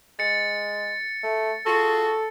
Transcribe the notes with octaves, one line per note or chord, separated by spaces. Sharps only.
G#3 A6 C#7
A3
F4 F#4 G#4 A4